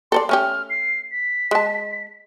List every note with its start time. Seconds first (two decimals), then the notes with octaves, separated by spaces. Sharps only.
0.12 A4 C5 D5 C6
0.29 A3 C#4 G4 F6
0.70 C7
1.12 B6
1.51 G#3 A5